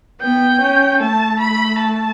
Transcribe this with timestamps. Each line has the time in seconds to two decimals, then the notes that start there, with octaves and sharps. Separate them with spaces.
0.21 B3 G5
0.62 C#4
1.00 A3 A5
1.40 B5
1.80 A5